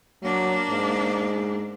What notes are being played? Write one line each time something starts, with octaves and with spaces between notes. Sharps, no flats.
F#3 A#3 D4
G#2